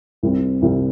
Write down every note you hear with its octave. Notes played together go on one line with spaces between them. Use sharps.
C2 C3 G3 C4
C2 C3 G3 C4